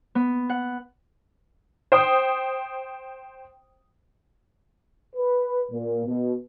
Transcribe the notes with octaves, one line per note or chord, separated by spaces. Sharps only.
B3
F#5
C5 G5 D#6
B4
A#2
B2